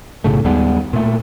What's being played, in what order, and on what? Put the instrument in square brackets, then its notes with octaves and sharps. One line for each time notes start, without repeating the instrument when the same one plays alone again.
[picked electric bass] B1 A2 C#3 A3
D#2 G3 G#3 B3
A#2 A3